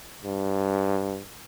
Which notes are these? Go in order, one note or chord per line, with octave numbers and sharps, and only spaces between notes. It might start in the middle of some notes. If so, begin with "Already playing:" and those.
G2